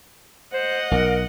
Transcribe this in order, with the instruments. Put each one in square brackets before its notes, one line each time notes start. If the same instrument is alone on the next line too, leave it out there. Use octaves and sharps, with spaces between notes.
[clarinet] C5 [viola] D#5 F#5
[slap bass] B1 [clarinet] A#4